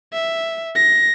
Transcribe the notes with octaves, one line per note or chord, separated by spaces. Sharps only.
E5
A#6